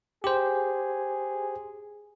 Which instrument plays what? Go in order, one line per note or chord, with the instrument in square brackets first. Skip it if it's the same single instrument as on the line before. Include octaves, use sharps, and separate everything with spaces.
[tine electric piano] G4 C5 [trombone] G#4